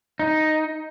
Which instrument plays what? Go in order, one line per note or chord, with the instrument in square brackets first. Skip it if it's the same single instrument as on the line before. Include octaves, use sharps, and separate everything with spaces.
[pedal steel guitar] D#4